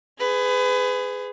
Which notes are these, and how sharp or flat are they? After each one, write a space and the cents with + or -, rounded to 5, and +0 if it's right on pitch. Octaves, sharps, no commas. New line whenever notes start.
G#4 +0 B4 +30